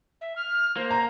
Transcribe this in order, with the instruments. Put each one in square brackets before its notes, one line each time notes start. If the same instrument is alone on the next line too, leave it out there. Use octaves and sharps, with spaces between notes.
[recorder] E5
F6
[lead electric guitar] A#3 [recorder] C5
[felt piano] A#5